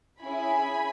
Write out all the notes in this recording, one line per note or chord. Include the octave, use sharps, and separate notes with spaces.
C#4 E4 G#4 G#5 B5